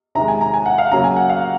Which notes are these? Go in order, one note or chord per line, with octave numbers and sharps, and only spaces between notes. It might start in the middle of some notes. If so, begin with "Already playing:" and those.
C3 D#3 G#3 A#5
G#5
A#5
G#5
F#5
F5
C#3 F#3 A#3 A#5
G#5
F#5
F5